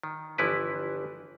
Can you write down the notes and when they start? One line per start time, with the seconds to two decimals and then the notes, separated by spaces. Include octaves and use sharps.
0.03 D#3
0.38 G1 E3 F3 E4 B4